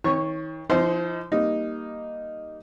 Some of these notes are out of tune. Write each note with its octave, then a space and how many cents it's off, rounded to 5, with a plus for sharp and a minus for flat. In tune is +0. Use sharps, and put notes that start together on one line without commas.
D#3 +40 C#5 -15 C#6 +0
F3 -30 D#4 +30 C5 +0
G3 +0 A#3 +0 D#4 +0